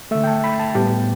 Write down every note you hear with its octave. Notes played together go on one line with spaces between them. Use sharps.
D3 A3 E5
G5
A5
B5
A5
A2 G3 B3 G4